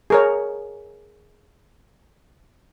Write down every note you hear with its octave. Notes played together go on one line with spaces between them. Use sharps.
G#4 A#4 C#5